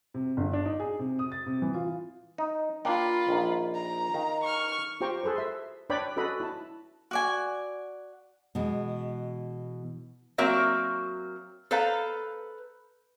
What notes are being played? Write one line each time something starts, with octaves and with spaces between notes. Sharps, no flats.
C3
G1
D4
D#4
G#4
C3
D#6
A6
C3
E3
F4
D#4
A#3 D4 F4 G5 B5
A#1 D#3 A#3
A#5
D#3 F5
C#6 F6
F4 G4 C5 G5 A#5 C#6
G#4 A4 B4 C5
E5 C6
D4 B4 C#5 D5 G5 B5
C#4 F#4 A4 B4 D#5 B5
E4 A5
F#4 D5 G#5
B2 E3 G#3
F#3 A#3 C4 F#4 A#4 E5
A4 B4 C5 F5 A#5